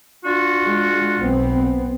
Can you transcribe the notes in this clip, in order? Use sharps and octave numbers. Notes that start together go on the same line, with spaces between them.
D4 F4 F#4
G#3
B1 B3 C4